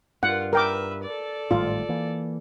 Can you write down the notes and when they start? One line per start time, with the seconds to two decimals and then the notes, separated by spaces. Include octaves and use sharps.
0.23 G2 F4 A#4 F#5
0.53 A#4 B4 E5 G5 D6
1.03 A4 D5
1.51 G#1 A2 G3 F4
1.89 E3 A#3